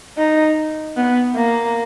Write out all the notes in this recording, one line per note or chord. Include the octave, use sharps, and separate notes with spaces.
D#4
B3
A#3